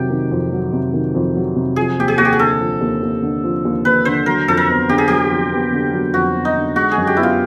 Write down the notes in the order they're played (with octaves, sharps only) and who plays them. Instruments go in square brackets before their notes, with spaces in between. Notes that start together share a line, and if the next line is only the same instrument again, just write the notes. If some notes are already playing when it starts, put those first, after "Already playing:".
Already playing: [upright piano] F2 C3 D#3 F#3 [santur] G4
[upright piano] D#3
F2
F#3
C3
D#3
F2
F#3
C3
[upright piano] F3 [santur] G#4
[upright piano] D#2 [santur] G4
[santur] G#4
[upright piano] D#2 [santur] F#4
[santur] G4
G#4
[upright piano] D3 [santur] A4
[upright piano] F3
D#2
D#2
D3
F3
D#2
[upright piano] D#2 [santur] B4
[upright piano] D3 [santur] C5
[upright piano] F#3 [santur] A#4
[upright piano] F2 [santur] A4
[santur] A#4
[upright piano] B3
[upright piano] D3 [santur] G4
[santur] G#4
[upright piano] F#3 [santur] G4
[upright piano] F2
B3
D3
F#3
[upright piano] F2 [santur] F#4
[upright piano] B3
[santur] D#4
[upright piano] D3
[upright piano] G#3 [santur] F#4
[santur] G#4
[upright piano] F#2
[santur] G4
[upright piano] B3 [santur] E4
[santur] F4